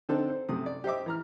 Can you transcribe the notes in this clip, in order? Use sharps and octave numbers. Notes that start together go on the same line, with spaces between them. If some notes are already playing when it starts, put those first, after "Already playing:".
D3 C4 D4 D#4 A4
C5
F#2 C3 A3 D#6
D5
G4 C5 D#5 E5 D6
E3 A#5 F6